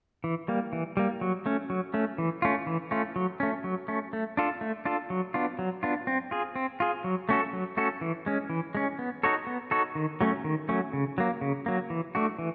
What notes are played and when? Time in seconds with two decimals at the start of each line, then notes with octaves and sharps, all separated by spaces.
0.24 E3
0.48 G3 A#3
0.73 E3
0.97 G3 A#3
1.21 F#3
1.46 A3 C#4
1.70 F#3
1.94 A3 C#4
2.18 E3
2.42 A3 C#4 F4
2.67 E3
2.91 A3 C#4 F4
3.16 F#3
3.40 A3 C#4
3.64 F#3
3.88 A3 C#4
4.13 A3
4.37 D4 F4 A4
4.61 A3
4.85 D4 F4 A4
5.10 F#3
5.34 B3 D4 F4
5.59 F#3
5.83 B3 D4 F4
6.07 C4
6.31 F4 G#4
6.56 C4
6.80 F4 G#4
7.04 F#3
7.29 A3 C#4 F#4 A4
7.53 F#3
7.77 A3 C#4 F#4 A4
8.01 E3
8.26 G#3 C#4
8.50 E3
8.75 G#3 C#4
8.99 B3
9.23 D#4 F#4 A4 C#5
9.47 B3
9.71 D#4 F#4 A4 C#5
9.95 D#3
10.21 F#3 A3 C#4
10.44 D#3
10.69 F#3 A3 C#4
10.93 C#3
11.18 F#3 A#3
11.41 C#3
11.66 F#3 A#3
11.90 E3
12.15 A3 D4 F#4
12.39 E3